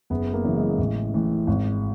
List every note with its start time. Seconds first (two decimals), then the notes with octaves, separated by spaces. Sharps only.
0.10 F#1 B3
0.34 A#3
0.45 F#2 C#3 E3
0.56 G#3
0.78 A1
1.14 A2 E3
1.47 G#1